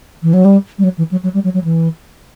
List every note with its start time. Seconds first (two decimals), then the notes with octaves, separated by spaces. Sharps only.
0.23 E3
0.34 F#3
0.45 G3
0.79 G3
0.84 F#3
0.98 E3
1.11 F#3
1.24 F#3
1.34 G3
1.44 F#3
1.54 F#3
1.64 E3